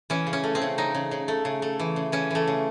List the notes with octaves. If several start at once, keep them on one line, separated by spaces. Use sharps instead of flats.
E3 C#4
C#3
C#4
A3
C4
C#3
C#3 D#4
C#3
C#3
A3
C#3
A3
E3
C#3
E3 C#4
E3 A3
C#3